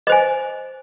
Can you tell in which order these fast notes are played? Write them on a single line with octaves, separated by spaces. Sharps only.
D#5 C5 G#5